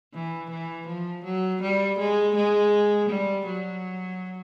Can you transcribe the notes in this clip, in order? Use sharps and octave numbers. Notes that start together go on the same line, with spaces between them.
E3
E3
F3
F#3
G3
G#3
G#3
G3
F#3